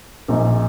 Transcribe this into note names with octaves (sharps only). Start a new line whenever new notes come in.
A#1 A#2 A#3 D#4